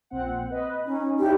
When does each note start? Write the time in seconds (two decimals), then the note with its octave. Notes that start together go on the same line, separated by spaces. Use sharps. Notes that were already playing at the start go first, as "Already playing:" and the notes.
0.10 A#1 C4 F#5
0.50 B4 D#5
0.86 C#4 D#4
1.00 D#4
1.19 D#4 E4 G4 D5